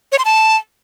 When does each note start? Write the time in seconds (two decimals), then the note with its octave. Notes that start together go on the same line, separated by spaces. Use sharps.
0.12 C#5
0.18 C6
0.25 A5